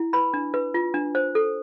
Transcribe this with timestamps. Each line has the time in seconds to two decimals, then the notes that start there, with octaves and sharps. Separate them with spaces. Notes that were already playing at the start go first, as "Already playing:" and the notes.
Already playing: E4
0.13 B4 B5
0.34 D4
0.54 B4
0.74 F4
0.94 D4
1.15 C5
1.35 A4